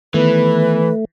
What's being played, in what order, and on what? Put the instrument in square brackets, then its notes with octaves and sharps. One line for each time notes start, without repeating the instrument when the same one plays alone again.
[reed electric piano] D#3 B3 [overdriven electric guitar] E3 [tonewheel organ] A3 [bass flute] B4